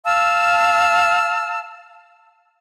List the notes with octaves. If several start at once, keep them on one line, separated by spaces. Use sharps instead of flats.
F5 A5 E6 F6